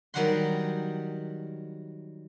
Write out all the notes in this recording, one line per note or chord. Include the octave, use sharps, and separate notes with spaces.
D#3 F#3 G3 F#4 F#5 C6